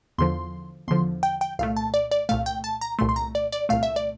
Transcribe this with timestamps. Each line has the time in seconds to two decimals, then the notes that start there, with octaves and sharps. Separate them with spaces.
0.18 E2 D3 F3 C6
0.88 E2 D3 F3 C6
1.23 G5
1.41 G5
1.59 C2 A#2 A3 F5
1.77 A5
1.94 D5
2.11 D5
2.29 C2 A#2 A3 F5
2.46 G5
2.64 A5
2.81 A#5
2.99 C2 A#2 A3 C6
3.09 C6
3.16 A#5
3.35 D5
3.52 D5
3.69 C2 A#2 A3 F5
3.83 E5
3.96 D5